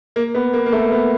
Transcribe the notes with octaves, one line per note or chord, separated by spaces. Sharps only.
A#3
B3
A#3
A#3
A3
B3